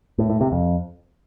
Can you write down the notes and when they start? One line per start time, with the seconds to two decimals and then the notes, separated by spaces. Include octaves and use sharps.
0.18 A2
0.30 A2
0.41 C3
0.52 F2